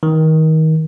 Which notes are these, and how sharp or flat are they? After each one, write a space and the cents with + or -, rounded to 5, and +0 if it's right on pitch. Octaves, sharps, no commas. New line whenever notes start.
D#3 +25